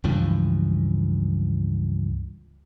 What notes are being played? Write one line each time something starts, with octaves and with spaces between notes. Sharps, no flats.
C#2 G2 E3 F3